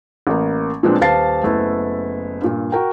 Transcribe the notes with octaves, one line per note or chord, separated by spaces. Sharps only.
A1 A#3
A#2 F3 G#3 B3 C4 D4
D#1 B4 F5 A5 A6 C7
F#1 A3 B3 E4
G2 A#2
F#4 A#4 G5